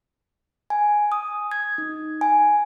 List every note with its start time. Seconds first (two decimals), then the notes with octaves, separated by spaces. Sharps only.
0.70 G#5
1.12 D#6
1.52 G#6
1.78 D#4
2.21 G#5